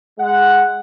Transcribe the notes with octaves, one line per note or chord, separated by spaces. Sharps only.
G#3 F#5